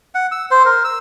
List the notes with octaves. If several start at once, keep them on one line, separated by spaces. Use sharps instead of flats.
F#5
E6
C5
A#4
E6